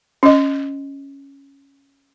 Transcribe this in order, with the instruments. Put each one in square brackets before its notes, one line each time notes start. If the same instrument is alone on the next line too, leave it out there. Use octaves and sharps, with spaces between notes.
[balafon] C#4 D#5